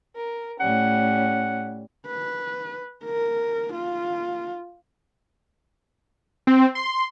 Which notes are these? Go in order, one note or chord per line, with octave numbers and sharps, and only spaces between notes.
A#4
A2 G3 C#4 F#5
B4
A#4
F4
C4
C6